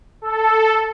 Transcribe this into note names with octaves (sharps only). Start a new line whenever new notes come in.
A4